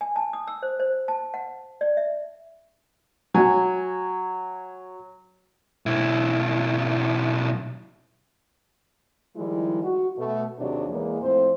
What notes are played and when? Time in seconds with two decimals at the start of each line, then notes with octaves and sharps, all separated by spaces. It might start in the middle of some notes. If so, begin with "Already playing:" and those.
0.01 G#5
0.16 A5
0.33 D#6
0.48 E6
0.63 C5
0.80 C5
1.08 A5
1.34 F#5
1.81 D5
1.97 E5
3.34 F#3 G#5
5.86 B1 E4
9.36 D#3 F3 G3 G#3 E4
9.83 F#4
10.17 B2 A3
10.59 D#2 C3 F#3 D4 G#4 C#5
10.89 E2 G#3 A#3
11.22 F2 A2 C4 C5